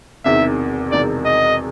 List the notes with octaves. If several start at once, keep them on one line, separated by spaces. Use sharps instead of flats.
E1 E2 C3 D#3 E5
E1 E2 C3 D#3 D5
D#5